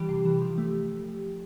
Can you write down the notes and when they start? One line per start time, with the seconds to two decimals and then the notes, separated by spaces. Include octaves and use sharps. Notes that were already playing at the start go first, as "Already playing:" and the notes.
Already playing: E3 G3 G4
0.09 C3
0.25 E3
0.41 F3
0.58 A3